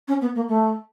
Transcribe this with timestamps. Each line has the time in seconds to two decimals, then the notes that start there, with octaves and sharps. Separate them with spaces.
0.07 C#4
0.21 B3
0.35 A#3
0.48 A3